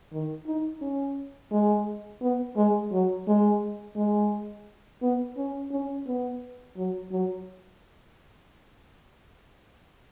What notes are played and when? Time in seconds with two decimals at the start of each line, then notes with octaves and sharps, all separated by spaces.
0.13 D#3
0.47 D#4
0.82 C#4
1.51 G#3
2.22 B3
2.56 G#3
2.92 F#3
3.27 G#3
3.96 G#3
5.02 B3
5.37 C#4
5.71 C#4
6.07 B3
6.77 F#3
7.12 F#3